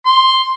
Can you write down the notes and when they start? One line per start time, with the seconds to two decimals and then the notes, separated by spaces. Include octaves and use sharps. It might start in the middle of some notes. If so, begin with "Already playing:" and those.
0.05 C6